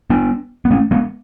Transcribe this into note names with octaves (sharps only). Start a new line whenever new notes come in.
B3 D4
B3
A3 C#4
G#3 B3